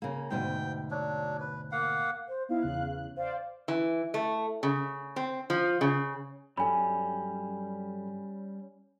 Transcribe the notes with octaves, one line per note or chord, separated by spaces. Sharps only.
C#3 A#3
D2 G#2 B2 G5
F#3 D4
B4
A#3 F5 F#5
C5
B3 D#4 E4 F5
E2 C#3 F#6
C5 D5 F5
E3
A3
C#3
C4
F3
C#3
G2 F#3 G3 C#4 A4 G#5 B5